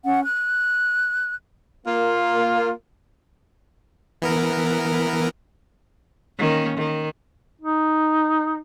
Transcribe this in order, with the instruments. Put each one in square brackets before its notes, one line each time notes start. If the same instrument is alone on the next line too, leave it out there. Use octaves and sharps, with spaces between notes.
[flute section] C#4 F#5
F#6
[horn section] A#3 F4
[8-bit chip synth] E3 B3 A#4
[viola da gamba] D#3 A#3 C#4
D#3
[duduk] D#4